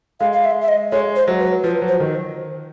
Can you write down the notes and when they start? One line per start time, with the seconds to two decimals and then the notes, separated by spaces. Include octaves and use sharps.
0.20 G#3 F5
0.33 F5
0.44 E5
0.62 E5
0.68 D#5
0.92 G#3 C#5
1.16 C5
1.28 F#3
1.40 B4
1.64 F3 B4
1.82 F#3
1.88 C5
2.00 D#3